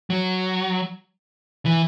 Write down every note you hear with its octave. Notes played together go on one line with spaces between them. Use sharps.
F#3
E3